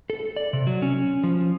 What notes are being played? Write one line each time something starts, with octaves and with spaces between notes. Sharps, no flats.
A4
D5
C3
F#3
C#4
F3